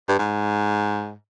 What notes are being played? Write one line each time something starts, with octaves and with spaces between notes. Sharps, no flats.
G2
G#2